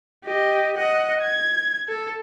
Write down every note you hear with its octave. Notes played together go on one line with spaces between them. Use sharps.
G4 D#5
D#5 F#5
G#6
A4